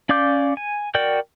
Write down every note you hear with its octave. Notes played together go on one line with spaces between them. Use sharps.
C#4 D5 F5 D6 G6
G#5
F#4 A#4 D5 G5 G6